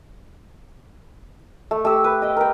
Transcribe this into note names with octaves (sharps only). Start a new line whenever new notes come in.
A3
A3 G4 E6
B4
D#5 G5
A#4 B4 G5